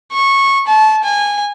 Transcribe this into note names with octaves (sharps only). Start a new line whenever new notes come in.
C#6
A5
G#5